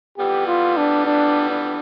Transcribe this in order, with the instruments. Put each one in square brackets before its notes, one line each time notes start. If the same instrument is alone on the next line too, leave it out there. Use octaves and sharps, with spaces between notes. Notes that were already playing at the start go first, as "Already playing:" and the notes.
[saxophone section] F2 E3 G3 B3 [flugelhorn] G4
[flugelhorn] F4
D4
D4
D4